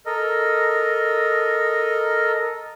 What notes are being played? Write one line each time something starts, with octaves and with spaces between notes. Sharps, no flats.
A4 A#4 D#5